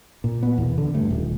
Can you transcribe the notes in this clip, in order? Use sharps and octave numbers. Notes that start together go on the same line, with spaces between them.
A#2
B3
E2 B2
D3
G2 A3
D#1